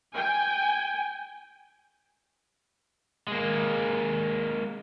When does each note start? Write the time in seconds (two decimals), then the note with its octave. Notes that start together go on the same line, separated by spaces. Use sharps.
0.14 G5 G#5
3.27 G#3 A#3